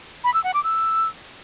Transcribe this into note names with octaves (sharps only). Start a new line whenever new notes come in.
B5
E6
F#5
D6
E6